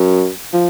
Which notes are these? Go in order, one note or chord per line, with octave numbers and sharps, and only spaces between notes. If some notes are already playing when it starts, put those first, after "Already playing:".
Already playing: F#2
F3